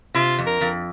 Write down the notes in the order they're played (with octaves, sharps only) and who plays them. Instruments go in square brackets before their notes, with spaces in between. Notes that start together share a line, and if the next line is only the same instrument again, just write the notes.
[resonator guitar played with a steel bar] C3 [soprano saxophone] F4
[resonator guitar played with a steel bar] F2
[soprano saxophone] A#4
[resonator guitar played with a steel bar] F2